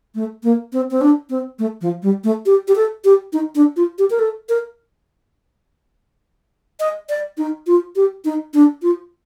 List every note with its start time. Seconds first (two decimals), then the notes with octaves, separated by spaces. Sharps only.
0.15 A3
0.43 A#3
0.73 C4
0.91 C4
1.01 D4
1.30 C4
1.59 A3
1.81 F3
2.03 G3
2.24 A3
2.46 G4
2.68 G4
2.75 A4
3.04 G4
3.33 D#4
3.55 D4
3.76 F4
3.98 G4
4.10 A#4
4.19 A4
4.49 A#4
6.80 D#5
7.09 D5
7.38 D#4
7.67 F4
7.96 G4
8.25 D#4
8.54 D4
8.82 F4